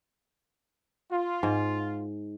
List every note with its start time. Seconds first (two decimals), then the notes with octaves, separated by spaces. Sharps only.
1.10 F4
1.43 G#2